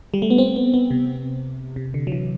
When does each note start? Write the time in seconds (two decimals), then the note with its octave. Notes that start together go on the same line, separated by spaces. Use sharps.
0.14 G3
0.22 A3
0.30 B3
0.38 C4
0.56 B3
0.74 B3
0.91 C3
1.76 C3
1.94 D3
2.07 F#3
2.12 E3